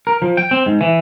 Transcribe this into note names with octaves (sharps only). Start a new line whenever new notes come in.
A#4
F3
G5
C4
G#2
E3